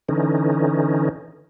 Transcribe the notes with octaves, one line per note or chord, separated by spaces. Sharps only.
D3 E3 C#4 D#4